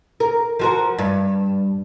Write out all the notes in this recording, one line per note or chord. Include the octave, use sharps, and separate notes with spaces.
A#4
F3 F#4 A#4
G2